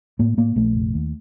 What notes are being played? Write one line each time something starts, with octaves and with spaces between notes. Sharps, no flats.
A2 A#3
A2 A#3
A#1 A3
F1
D#2